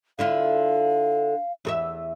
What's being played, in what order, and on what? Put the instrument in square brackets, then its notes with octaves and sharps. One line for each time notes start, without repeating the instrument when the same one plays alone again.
[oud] D3 E4 F4 [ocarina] F5
[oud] E2 A4 E5